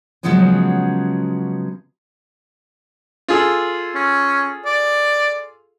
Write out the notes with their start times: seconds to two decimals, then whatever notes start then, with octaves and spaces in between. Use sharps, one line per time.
0.23 C#3 F3 F#3 G#3 B3 C#4
3.28 F4 G#4 A4
3.95 C#4
4.65 D5